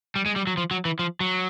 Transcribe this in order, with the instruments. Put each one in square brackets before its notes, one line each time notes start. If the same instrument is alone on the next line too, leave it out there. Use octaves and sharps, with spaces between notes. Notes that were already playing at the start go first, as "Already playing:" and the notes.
[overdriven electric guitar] G3
G#3
G3
F#3
F3
F#3
E3
F3
F#3